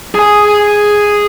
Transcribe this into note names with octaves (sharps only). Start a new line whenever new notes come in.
G#4 G#5